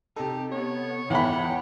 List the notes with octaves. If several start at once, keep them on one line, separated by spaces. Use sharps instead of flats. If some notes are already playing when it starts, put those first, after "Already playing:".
C3 D#4 G4 A4
B3 C#5
E2 B4 C#5 F#5 G5 B5